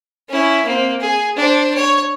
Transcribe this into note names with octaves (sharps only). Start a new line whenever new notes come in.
C#4 E4
A#3 C4
G#4
D4 C5
C#5